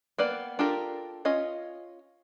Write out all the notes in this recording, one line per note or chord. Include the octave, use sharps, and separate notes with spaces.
A#3 B3 B4 D5 G5
D4 F4 G4 A4 A#4
C#4 F4 D#5